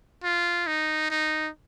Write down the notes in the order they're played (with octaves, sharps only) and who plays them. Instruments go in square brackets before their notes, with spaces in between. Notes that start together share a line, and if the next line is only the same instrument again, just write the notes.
[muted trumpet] F4
D#4
D#4